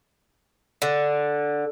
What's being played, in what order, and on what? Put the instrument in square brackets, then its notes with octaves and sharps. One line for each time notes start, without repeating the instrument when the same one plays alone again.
[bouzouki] D3